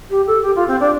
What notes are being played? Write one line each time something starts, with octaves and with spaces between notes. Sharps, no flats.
G4
A4
G4
F4
C4
D4